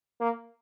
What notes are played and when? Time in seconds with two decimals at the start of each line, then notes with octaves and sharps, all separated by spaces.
0.21 A#3